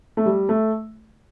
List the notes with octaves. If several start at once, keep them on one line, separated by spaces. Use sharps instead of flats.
A3
G3
A3